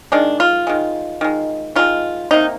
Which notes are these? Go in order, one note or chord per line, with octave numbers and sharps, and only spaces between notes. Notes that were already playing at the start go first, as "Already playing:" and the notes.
D#3 G#3 D4
F4
D#3 G#3
D#3 G#3
D#3 G#3 F4
C3 D#3 A#3 D#4